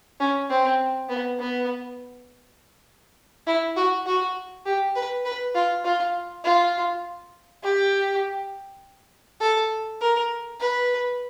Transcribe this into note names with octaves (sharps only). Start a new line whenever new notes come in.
C#4
C4
B3
B3
E4
F#4
F#4
G4
B4
B4
F4
F4
F4
G4
A4
A#4
B4